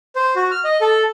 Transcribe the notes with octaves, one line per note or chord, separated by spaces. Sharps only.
C5
F#4
F6
D#5
A4